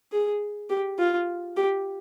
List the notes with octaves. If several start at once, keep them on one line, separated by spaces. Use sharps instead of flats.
G#4
G4
F4
G4